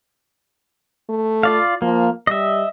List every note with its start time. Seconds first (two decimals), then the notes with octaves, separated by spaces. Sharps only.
1.09 A3
1.43 F4 D5 F5
1.82 F3 A#3
2.27 G3 D#5 E5